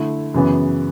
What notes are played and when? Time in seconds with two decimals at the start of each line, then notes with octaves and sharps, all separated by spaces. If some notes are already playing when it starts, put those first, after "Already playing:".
Already playing: D3 A3 E4
0.34 F#2 C#3 E3 B3